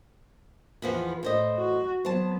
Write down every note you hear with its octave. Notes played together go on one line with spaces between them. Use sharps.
E2 F3 B3
A2 C5 D#5
F#4
F#3 B3 C5 A5